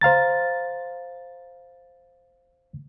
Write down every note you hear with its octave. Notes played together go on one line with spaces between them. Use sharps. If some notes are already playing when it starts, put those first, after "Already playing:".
C5 F5 A#5 A6